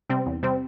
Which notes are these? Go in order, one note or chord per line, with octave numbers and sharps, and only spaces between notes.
C3 G3 C4
E2
C3 G3 C4